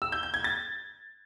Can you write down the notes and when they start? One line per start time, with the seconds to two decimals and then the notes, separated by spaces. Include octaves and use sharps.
0.02 E6
0.12 G6
0.23 G6
0.34 G#6
0.44 A6